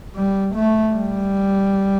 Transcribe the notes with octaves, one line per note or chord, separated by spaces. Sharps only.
G3
A3
G3